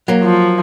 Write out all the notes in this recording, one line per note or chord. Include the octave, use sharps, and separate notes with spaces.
F#3 A#3
F3